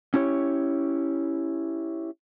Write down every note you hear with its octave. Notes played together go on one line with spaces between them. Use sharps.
C#4 E4 G4 C#5